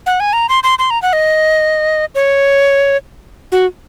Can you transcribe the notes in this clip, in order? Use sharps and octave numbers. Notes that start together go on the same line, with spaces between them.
F#5
G#5
A#5
C6
C6
C6
A#5
F#5
D#5
C#5
F#4